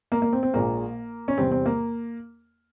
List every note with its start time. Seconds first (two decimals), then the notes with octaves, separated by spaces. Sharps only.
0.12 A#3
0.22 A#3
0.33 C4
0.43 C4
0.53 A#1 A#2 G#3 A#3
1.28 C#4
1.38 E2 C3 G3 C4
1.52 C4
1.66 A#3